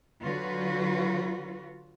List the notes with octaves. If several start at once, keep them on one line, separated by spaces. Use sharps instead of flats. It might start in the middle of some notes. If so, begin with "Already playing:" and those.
D3 F#3 F4 F#4 B4